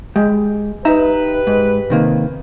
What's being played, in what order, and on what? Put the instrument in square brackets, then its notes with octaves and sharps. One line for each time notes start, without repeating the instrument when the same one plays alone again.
[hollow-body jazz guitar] G#3 G4
[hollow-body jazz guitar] D#4 E5 A#5 [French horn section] G4 B4
[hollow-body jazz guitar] G#2
C3 D#3 A#3